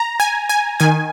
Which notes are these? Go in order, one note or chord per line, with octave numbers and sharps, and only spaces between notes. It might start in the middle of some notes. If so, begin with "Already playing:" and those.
Already playing: A#5
G#5
G#5
D#3 G#5